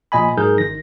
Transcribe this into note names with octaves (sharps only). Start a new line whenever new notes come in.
A#1 A#2 D#5 G#5 B5
G#2 F#3 D#4 G#4 A#4 G6
G#1 D#3 A#6